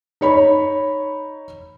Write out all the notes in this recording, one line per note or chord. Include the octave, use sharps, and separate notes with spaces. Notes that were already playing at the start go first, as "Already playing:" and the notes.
D#4 C#5 B5